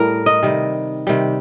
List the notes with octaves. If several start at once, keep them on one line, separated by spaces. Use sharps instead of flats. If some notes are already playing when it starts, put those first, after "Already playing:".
Already playing: A2 G3 A#4
D#5
C3 D#3 G3
C3 D#3 G3